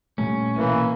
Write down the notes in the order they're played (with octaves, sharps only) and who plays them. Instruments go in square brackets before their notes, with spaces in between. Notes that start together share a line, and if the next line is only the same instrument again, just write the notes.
[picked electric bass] A#2 G3 A3 [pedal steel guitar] C#4
[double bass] B2 A#3 [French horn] E3